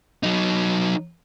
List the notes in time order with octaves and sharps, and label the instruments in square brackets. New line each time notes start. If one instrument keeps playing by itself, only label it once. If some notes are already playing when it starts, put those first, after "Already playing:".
[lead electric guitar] F#3 D#4